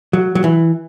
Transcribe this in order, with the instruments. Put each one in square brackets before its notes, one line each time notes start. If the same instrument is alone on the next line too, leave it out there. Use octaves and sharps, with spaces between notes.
[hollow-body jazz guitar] F#3
F#3
E3